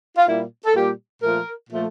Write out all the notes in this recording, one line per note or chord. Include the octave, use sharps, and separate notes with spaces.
F4
A#2 G3 A#3 E4
A4
A#2 G3 A#3 G4
A#2 F3 A3 A#4
A#2 F3 A3